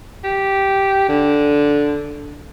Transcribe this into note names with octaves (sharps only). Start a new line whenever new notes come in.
G4
D3